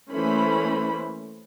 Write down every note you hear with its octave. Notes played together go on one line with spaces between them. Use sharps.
E3 A3 A#3 C#4 C5 B5